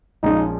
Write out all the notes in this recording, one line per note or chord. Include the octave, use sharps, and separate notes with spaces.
A#1 A#2 F3 G#3 C#4 D#4